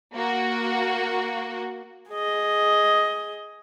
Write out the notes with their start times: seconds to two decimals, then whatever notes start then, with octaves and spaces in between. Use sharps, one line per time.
0.14 A#3 F#4
2.11 G#4 D#5